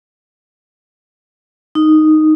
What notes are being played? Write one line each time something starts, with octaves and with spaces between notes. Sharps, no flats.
D#4